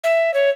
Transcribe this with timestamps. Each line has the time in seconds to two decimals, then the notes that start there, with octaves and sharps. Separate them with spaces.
0.04 E5
0.34 C#5